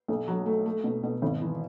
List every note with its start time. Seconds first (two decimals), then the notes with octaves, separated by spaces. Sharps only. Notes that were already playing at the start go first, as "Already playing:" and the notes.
0.08 B1
0.28 F#3
0.46 A3
0.66 A3
0.84 B2
1.03 B2
1.22 G#1
1.41 E3